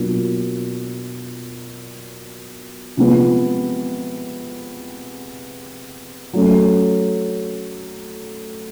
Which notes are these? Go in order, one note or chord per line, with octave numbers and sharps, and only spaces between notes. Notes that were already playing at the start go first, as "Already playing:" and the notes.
Already playing: B2 F#3 A#3 D4 F4
C3 F3 G#3 B3
F#3 A3 C#4